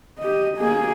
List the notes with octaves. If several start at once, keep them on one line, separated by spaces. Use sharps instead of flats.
G4 D#5
A#3 G#4